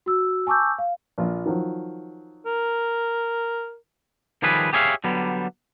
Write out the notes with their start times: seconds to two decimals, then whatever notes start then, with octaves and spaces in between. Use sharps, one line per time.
0.06 F#4 E6
0.47 G#5 A5 C#6 D6 E6 G6
0.78 F5
1.18 A#1 F4
1.46 D#3 F3 F#3
2.46 A#4
4.42 D#3 F3 G3 G#4 B4
4.73 G4 G#4 C#5 E5 F5
5.04 D3 F#3 G3 B3